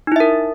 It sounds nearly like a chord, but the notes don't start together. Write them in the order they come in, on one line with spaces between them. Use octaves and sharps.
D#4 E4 E5 A#4